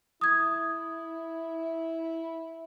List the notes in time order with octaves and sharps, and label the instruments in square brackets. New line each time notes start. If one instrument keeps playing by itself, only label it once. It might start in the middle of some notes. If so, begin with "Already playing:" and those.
[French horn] E4 [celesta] D#6 G#6